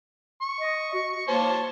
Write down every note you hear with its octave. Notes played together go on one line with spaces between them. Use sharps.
C#6
D#5
F#4
A#3 C5 C#5 A5